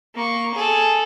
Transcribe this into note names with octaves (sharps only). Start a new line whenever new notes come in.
A#3 C#6
G#4 A4